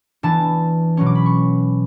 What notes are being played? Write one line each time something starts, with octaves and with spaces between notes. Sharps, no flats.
E3 B3 D4 A5
B2 F#3 C#4 C#6
D6
B5
C#6